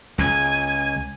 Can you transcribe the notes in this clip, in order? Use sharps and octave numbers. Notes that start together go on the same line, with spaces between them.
C#2 G#5